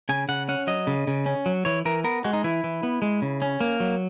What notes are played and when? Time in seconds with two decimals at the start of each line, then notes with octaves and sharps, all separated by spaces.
0.09 C#3 G#5
0.29 C#3 F#5
0.49 C#4 F#5
0.67 F#3 D#5
0.87 C#3
1.07 C#3
1.26 C#4
1.46 F#3
1.65 E3 C#5
1.85 E3 A#4
2.04 B3 A#4
2.24 G#3 F#4
2.33 D#4
2.44 E3 E4
2.64 E3
2.83 B3
3.02 G#3
3.22 C#3
3.42 C#4
3.61 A#3
3.80 F#3